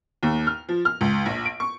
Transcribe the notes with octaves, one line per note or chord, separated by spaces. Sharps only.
D#2
F6
F3
F6
C#2
A#1
D7
C#6